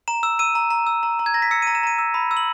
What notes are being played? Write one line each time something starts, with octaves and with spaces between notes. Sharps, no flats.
A#5 E7
E6 E7
E6 D#7
A#5
A#5
E6
A#5
A#5
G#6
A#5 A#6
B6
E6 C#7
A#5 D#7
E7
A#5 D#7
E6
B5
E6
F#7